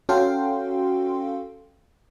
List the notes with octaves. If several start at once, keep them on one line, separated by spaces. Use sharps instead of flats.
C#4 F#4 A4 F5 G5 C6